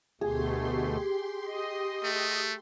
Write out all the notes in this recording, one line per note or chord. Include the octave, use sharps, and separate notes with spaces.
D2 B2 A3 G4 G#4 C6
D#5
A3